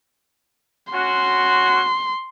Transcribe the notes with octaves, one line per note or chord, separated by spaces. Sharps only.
C#4 F#4 C6